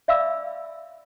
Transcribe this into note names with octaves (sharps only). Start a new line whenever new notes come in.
D5 E5 F5 B5 D6 E6